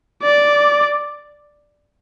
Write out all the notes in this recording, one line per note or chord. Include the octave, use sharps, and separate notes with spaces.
D5